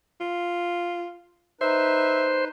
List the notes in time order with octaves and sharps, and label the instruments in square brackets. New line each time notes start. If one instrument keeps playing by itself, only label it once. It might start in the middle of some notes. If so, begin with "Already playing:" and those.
[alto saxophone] F4
[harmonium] D#4 B4 [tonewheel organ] C5 [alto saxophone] E5